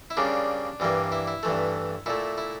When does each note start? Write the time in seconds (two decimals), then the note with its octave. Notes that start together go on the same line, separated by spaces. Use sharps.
0.10 E4
0.17 C#3 G3 A#3 D4
0.80 G2 E3 G3 A#3
1.12 E4
1.27 E4
1.43 G2 E3 A3
2.06 A#2 A3 E4
2.38 E4